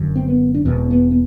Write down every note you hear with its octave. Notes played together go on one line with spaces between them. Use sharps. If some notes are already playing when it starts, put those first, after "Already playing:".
Already playing: F#1 F#2 D3
C4
B3
D4
E1 E2 B2 C4
B3
B3